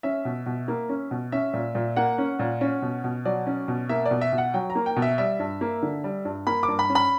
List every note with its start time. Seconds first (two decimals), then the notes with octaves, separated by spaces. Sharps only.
0.03 C#4 E5
0.25 B2
0.46 B2
0.68 A#3
0.89 C#4
1.11 B2
1.32 C#4 E5
1.54 A#2
1.75 A#2
1.96 A#3 F#5
2.18 C#4
2.39 A#2
2.61 C#4
2.82 B2
3.04 B2
3.25 F#3 D5
3.47 C#4
3.68 B2
3.89 A#3 E5
4.06 D5
4.11 B2
4.21 E5
4.33 B2
4.38 F#5
4.54 F#3 G5
4.70 A#5
4.75 A#3
4.86 G5
4.96 B2
5.02 E5
5.18 G3 E5
5.39 G2
5.61 A#3
5.83 D3
6.04 G3
6.25 G2
6.47 A#3 B5
6.63 D6
6.68 G2
6.79 B5
6.89 C#4
6.95 B5